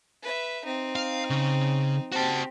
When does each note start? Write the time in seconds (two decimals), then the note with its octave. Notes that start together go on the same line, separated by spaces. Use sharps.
0.22 B4 E5
0.64 C4 D#4
0.96 F5
1.30 C#3
2.12 C4 F#4 G4 A5